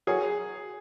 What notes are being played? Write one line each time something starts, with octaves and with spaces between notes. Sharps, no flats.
F#3 G#4